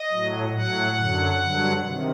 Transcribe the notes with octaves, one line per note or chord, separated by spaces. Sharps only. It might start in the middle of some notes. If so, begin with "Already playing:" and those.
Already playing: D#5
A2 F#3
A2 F#3 F#5
F#2 D3 F#3
G2 D3 F#3
C3 D#3